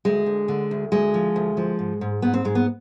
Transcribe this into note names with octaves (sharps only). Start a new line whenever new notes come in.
D2 G#3
D2
D3
D2
D2 G#3
F3
D2
F3
G#2
G#2
G#2 B3
C4
G#2 G#3
B3